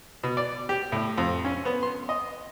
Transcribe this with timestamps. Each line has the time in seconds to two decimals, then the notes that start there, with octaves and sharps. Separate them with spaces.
0.23 B2
0.37 D5
0.69 G4
0.92 A2
1.18 F2
1.45 C#4
1.65 B3
1.83 C6
2.09 D#5